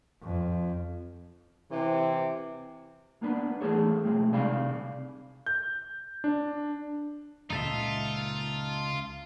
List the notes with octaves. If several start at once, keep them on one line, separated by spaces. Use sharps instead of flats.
F2
C3 E3
A#3 B3 D4 B4
E3 A3 G#4 A4 C#5
B1 F3 G#3 A3 C4
C2 C3 C4 D5 F5 B5
G6
D4
C#2 A#2 C#3 D#4 F4 A4 E5